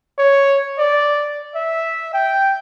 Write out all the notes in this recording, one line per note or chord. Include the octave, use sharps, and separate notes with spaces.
C#5
D5
E5
G5